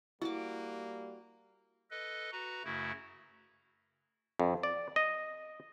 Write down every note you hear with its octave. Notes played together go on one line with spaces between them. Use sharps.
G3 A#3 E4 F#4 D6
A4 B4 D#5
F#4 B4 A#5
F#2 C#3 A3 E4 F#4
F2
D5
D#5